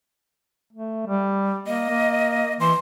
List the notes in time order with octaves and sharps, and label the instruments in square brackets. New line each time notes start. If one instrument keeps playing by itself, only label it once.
[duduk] A3
G3
[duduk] A#3 [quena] D#5
[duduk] A#3
[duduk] E3 [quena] C6